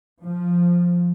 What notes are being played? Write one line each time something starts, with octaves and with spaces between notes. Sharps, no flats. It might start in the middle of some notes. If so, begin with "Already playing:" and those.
F3